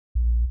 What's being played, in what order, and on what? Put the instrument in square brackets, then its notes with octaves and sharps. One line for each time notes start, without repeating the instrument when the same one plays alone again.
[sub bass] A#1